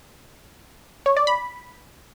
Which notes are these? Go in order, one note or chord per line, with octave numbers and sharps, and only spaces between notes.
C#5
D5
B5